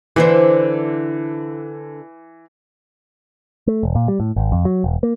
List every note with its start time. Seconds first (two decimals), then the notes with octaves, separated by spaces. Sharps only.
0.16 D3 E3 E4 C5
3.67 A3
3.83 E1
3.96 A#2
4.08 G3
4.20 A2
4.36 G#1
4.52 F2
4.65 F#3
4.84 E1
5.03 A#3